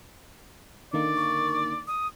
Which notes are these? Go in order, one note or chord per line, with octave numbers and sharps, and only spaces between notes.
D3 D#3 A#3 D5
C#6
D#6